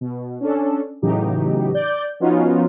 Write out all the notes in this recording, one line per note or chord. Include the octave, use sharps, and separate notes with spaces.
B2
C#4 D4 A4
A2 C#3 E3 F#3 D#4 G4
D5 G6
F3 B3 C#4 D#4 F4 F#4